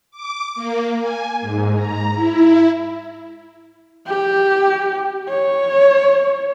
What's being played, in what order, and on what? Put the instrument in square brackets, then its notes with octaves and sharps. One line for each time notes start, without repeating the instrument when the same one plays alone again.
[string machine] D6
A#3
G#5
G#2
A#5
E4
[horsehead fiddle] G4
C#5